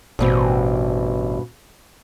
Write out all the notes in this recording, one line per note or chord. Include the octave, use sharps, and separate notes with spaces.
A1 G2 B2 C4